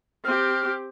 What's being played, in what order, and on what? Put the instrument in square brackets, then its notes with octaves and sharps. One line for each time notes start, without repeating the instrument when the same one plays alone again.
[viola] C4 G4 [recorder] F6